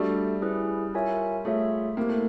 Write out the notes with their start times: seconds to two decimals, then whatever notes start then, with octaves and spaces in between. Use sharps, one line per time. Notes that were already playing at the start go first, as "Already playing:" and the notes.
Already playing: G3 A3 D4 F#4 A4 D5
0.42 C#4 E4 G#4 B4
0.94 F4 A#4 C#5 E5 G#5
1.45 A3 F4 G#4 C#5 E5
1.97 A#3 C4 E4 G4
2.09 A3